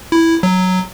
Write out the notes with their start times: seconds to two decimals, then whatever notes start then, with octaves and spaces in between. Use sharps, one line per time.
0.12 E4
0.43 F#3